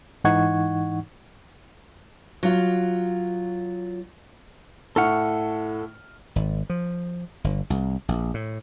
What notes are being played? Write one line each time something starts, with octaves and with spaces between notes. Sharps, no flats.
G#2 E3 D#4 F#5 C#6 G#6
F#3 F4
A2 A4 F#5 C#6 F6
G#1
F3
G1
C2
A#1
A2